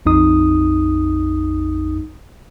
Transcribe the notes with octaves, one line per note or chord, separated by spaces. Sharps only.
A#1 F2 D#4 D#6